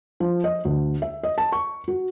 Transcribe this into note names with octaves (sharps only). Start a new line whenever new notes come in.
F3
D#5
D2
E5
D#5
A5
C#6
F#4